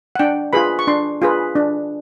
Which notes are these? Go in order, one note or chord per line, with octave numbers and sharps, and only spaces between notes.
F#5
D4 G5
F4 G#4 B4 B5
C#6
D4 C6
F4 G#4 B4
D4